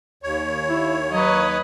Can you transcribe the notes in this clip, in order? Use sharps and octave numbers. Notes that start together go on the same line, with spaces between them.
D#2 C#5
E4
F#3 B4 D#5